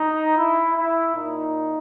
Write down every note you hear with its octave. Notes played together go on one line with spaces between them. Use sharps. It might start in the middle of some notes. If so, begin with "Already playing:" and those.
Already playing: D#4
E4
E4
A#2 D#4